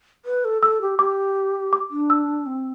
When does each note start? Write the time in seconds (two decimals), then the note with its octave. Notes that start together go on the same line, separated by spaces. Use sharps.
0.25 B4
0.45 A4
0.62 A4 E6
0.81 G4
0.99 G4 D6
1.73 D6
1.90 D4
2.10 E6
2.46 C4